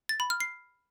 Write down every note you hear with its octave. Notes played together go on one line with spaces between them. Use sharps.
A6
B5
F6
C7